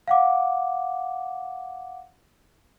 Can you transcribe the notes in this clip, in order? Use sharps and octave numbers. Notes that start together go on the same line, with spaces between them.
F5 F#5 D6